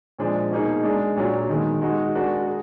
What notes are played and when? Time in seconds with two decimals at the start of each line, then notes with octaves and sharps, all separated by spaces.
0.19 A#2 F3 G#3 D4
0.51 B2 A#3 D#4 G#4
0.84 G#3 D4 G#4
1.16 A#2 F#3 D4
1.49 D#3 G#3 B3
1.81 G#3 D#4 F#4
2.14 G#3 D4 F#4 A#4
2.47 G#4